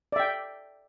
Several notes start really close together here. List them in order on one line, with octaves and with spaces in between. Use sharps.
D5 E5 G5